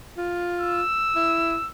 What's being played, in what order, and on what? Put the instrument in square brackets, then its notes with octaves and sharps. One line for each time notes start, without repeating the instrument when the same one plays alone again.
[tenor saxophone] F4
[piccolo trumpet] E6
[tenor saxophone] E4